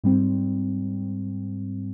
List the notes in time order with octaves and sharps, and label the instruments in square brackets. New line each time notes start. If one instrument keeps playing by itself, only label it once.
[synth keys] G#2 G3 C4